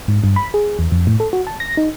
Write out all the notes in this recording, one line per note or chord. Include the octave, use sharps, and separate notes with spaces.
G#2
G2
B5
G#4
E2
F2
A2
A4
F#4
A5
A#6
D#4